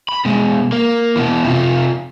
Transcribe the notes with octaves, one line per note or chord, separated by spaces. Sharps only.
B5
B2 G#3
A#3
B2 E3
C3 F4